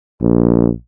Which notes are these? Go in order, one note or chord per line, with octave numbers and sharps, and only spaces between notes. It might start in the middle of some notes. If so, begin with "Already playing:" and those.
A#1